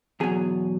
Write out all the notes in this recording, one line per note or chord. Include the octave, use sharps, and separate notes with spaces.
E2 B2 F#3 G#4